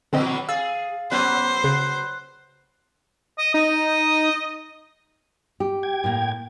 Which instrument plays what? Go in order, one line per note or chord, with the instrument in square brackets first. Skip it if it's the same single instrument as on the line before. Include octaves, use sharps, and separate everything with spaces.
[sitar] A#2 E3 F#3 [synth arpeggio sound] D3 C4 D#5
[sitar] G#4 [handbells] F5 A6 [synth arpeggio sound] E6
[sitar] F#3 B4 [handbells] B3 C#4 F#6 [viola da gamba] C5
[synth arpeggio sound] C#3 [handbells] F#6
[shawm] D#5
[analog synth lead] D#4 [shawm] D#5
[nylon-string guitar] G4
[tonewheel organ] G5 G#6
[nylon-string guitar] A2 A#3